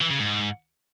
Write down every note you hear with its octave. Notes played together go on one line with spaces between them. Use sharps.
E3
C#3
G#2